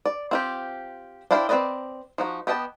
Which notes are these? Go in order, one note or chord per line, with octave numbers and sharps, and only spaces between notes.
D5
C4 F4 G4
D4 E4 C5 F5 G5
C4 G#4 B4 D5 D#5
F3 D#4 F#4
B3 G4 D#5 F#5 A5